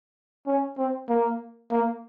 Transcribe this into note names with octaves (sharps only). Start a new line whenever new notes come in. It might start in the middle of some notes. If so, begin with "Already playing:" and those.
C#4
C4
A#3
A#3